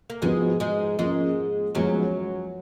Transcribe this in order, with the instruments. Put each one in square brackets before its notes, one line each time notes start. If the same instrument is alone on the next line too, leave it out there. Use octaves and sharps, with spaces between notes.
[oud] A#3
[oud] G#2 G#3 [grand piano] F3 B3 F#4
[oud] G#2 G#3
[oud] G#2 G#3 [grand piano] F3 A#3 C#4 F4 G#4
[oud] F#2 F#3 [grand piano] F3 G#3 B3 F#4